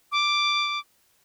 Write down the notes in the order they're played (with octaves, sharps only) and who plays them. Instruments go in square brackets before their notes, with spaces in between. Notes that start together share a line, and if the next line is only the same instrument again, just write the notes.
[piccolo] D6